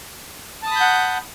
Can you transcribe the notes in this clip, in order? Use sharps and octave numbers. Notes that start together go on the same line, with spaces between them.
F#5 A5 B5 D#6 G6